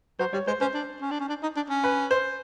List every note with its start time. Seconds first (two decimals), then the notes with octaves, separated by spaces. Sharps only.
0.19 F#3 C5
0.33 G3 C#5
0.47 G#3 C5
0.61 C#4 C5
0.74 D4
1.01 C#4
1.11 D4
1.20 C#4
1.29 D4
1.43 D#4
1.56 D4
1.70 C#4
1.84 B4
2.11 C5